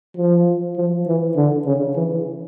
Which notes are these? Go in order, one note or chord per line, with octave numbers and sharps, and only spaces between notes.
F3
F3
E3
D3
C#3
E3